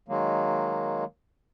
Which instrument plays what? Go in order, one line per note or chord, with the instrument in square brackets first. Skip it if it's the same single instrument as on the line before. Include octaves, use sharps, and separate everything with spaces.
[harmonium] D#3 F#3 G#3 A#3